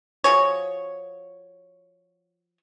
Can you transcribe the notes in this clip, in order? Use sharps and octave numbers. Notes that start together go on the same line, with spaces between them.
F3 F#4 G#4 C#5